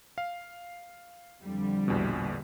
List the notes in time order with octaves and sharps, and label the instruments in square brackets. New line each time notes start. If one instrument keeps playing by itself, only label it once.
[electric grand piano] F5
[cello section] F2 D3 G3
[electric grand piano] A#1 E2 B2